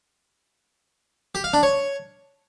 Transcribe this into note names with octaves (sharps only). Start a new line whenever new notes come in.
G4
F5
D4
C#5